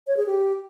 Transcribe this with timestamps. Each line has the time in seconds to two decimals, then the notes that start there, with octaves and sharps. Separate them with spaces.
0.07 C#5
0.17 G#4
0.26 G4